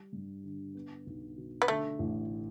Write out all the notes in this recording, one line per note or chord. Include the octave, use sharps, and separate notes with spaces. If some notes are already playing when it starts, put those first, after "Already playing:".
Already playing: G3
G2
D3
B3
B1
B2
B3
D3 A3
A1